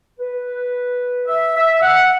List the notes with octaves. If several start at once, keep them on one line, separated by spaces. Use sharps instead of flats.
B4
E5
E5
F#5